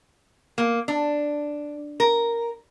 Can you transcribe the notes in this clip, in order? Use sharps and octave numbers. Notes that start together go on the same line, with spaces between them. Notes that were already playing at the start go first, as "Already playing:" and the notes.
A#3
D4
A#4